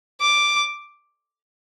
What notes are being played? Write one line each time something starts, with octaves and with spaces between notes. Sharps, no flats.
D6